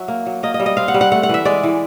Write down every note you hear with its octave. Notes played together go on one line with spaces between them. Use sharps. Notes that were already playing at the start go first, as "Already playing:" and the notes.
Already playing: F#3 E5
A#3
F#3
A#3 D#5
D#5
G3
D#5
C4 F5
F#5
G3
F#5
A3 F#5
F#5
E3 E5
G#3 D5
E3